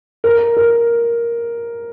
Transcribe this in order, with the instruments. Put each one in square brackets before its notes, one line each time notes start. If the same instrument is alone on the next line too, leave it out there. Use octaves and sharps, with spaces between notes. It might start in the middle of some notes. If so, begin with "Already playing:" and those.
[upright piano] A#4
A#4